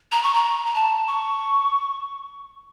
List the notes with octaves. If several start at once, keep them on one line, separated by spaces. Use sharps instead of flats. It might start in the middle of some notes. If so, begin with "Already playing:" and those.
A#5
C#6
A#5
A#5
A5
C#6